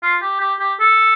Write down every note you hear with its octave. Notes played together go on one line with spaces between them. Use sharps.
F4
G4
G4
G4
A4